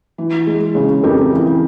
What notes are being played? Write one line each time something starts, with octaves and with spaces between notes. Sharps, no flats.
E3
G#3
C#3
F2 G4 A#4
E3